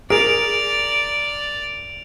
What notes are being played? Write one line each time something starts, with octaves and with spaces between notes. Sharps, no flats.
G#4 A#4 D5 D7 F7